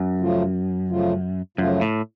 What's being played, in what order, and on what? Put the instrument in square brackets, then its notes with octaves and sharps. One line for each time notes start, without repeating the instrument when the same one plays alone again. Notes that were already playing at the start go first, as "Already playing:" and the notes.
Already playing: [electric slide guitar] F#2
[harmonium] C#3 F3 A3 F4
C#3 F3 A3 F4
[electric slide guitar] F#2 [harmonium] C#3 F3 A3 F4
[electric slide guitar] A2